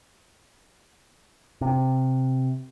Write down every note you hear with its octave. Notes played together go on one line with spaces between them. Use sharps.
C3